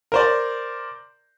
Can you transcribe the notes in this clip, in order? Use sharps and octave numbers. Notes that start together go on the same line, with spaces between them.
A#4 C5 D5